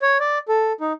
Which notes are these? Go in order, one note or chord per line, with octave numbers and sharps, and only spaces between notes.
C#5
D5
A4
D#4